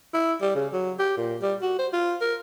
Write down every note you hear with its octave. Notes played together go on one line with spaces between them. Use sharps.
E4
G3
C#3
F#3
G4
A#2
G3
F#4
C5
F4
A#4